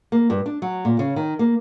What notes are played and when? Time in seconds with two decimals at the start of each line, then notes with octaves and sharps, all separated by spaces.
0.12 A#3
0.30 G2
0.46 D4
0.62 F#3
0.85 A#2
0.99 C#3
1.16 D#3
1.39 A#3